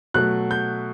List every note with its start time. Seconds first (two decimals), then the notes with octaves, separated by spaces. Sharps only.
0.14 B2 F#3 A3 F#6
0.51 G6